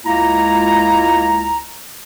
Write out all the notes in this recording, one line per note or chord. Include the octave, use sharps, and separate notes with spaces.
C#2 G#3 A#3 E4 F4 A#5